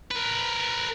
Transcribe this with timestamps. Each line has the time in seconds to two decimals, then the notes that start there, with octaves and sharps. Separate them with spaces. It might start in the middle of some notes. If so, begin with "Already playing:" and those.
0.11 A#4 B4